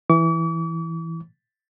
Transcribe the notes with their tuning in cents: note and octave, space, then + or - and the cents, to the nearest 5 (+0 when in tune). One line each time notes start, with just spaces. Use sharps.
E3 +0 D6 -45